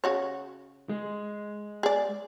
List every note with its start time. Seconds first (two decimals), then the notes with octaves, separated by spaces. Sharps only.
0.04 C#3 F#4 C#5
0.89 G#3
1.83 G#4 D5